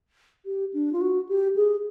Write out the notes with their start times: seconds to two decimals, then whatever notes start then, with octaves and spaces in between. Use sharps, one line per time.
0.46 G4
0.74 D4
0.93 F4
1.01 F#4
1.29 G4
1.56 G#4